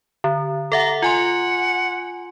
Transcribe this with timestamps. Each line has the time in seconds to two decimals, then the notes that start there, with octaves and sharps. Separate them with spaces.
0.24 D3
0.72 A4 E5 F#5 A#5
1.02 F4 F#5 G#5 C6